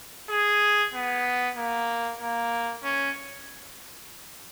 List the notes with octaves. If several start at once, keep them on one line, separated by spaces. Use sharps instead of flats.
G#4
B3
A#3
A#3
C#4